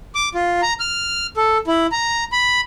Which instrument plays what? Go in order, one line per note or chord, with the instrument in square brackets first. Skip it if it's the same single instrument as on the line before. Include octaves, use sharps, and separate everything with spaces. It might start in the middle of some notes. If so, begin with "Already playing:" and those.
[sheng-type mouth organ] D6
F4
A#5
F6
A4
E4
A#5
B5